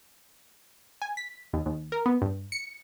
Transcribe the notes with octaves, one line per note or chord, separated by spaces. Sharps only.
G#5
B6
D#2
D#2
A#4
B3
G2
C#7